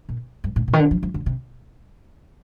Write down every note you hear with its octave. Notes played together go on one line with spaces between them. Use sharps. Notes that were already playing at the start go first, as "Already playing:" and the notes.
A#2
G2
A2
A#2
D#3
D3
F3
F3
D3
C3